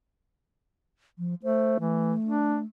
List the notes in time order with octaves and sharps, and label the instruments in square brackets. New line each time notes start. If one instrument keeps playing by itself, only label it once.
[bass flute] F3
[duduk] A3 [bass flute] C5
[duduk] E3 [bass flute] A3
[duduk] D4